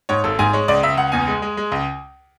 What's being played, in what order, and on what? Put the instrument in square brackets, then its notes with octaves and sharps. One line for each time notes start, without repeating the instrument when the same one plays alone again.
[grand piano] G#2 C#5
G#1 A4
G#2 G#5
G#3 C#5
C#2 D5
C#2 E5
C#2 F#5
E2 G#5
G#3
G#3
G#3
C#2